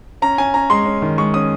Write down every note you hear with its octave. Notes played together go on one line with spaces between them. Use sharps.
C#4 A#5
C#4 G#5
C#4 A#5
G#3 C6
C#4
D#3
G#3 C#6
C#4 D#6